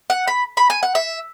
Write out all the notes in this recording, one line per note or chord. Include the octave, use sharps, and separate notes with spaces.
F#5
B5
B5
G#5
F#5
E5